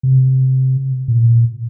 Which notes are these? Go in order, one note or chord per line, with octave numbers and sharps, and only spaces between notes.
C3
A#2